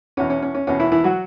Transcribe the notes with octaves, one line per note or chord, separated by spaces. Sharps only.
E2 B2 C#4
C#4
C#4
C#4
E2 B2 C#4
E3 E4
E3 E4
F#3 F#4